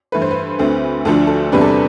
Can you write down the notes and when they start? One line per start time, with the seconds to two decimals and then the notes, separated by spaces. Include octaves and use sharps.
0.12 G2 E3 A3 B4
0.22 C5
0.31 B4
0.59 D2 D3 A3 C4
1.05 D2 D3 F3 A3 D4 A4
1.27 A4
1.52 E2 C3 G3 D4 B4
1.61 A4